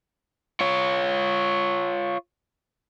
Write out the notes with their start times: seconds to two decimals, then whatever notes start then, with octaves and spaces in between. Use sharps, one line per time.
0.61 F4 C#5